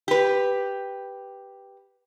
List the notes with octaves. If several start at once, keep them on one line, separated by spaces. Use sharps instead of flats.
G4 B4